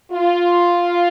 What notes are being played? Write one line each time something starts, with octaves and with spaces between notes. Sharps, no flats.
F4